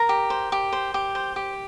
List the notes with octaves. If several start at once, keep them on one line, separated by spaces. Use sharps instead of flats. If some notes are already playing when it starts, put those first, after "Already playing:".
Already playing: A#4 A#5
G4
C5
G4
C5
G4
C5
G4